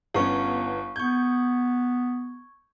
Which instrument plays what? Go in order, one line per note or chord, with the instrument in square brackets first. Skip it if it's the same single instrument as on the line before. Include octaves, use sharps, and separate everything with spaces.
[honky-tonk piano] G1 B3 C#4 [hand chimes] F5 C#6
[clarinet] B3 [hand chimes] C#6 G#6 [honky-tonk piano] G6